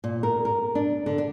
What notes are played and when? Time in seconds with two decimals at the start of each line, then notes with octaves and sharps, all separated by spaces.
0.04 A#2
0.23 A#4
0.45 A#4
0.75 D4
1.06 D3
1.18 D4